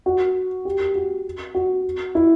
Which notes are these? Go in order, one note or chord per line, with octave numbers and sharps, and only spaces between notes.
F#4
G4
G4
F#4
F#4
E4